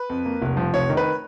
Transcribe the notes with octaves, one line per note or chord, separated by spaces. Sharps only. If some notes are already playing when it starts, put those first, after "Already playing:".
Already playing: B4
F2
A#3
F1
F3
F1 C#5
D#3
B4